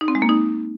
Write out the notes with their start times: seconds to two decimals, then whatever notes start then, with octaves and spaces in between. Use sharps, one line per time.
0.01 D#4
0.08 C4
0.15 G#3
0.22 A#3
0.29 D#4